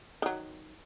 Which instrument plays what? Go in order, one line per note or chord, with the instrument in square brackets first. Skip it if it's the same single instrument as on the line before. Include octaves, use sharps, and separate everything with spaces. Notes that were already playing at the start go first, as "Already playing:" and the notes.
[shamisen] D#3 F#3